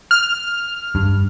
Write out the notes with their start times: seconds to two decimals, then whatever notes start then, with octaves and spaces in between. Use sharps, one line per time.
0.11 F6
0.95 G2